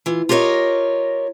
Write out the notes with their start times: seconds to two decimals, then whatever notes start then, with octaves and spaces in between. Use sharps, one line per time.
0.06 E3 F4
0.29 F4 G4 A#4 C5 C#5 D#5